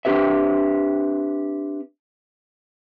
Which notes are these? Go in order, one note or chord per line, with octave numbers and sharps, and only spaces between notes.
C4 D4 G4 B4 E5